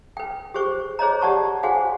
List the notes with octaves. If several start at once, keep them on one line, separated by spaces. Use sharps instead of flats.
B4 G5
G4 G#4 C5 C#6
G#4 C5 C#5 D#5 A#5
G4 D5 F#5 A5 C#6
F#4 G#4 C5 F5 F#5 G#5